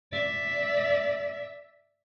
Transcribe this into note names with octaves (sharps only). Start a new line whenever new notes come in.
D5 E5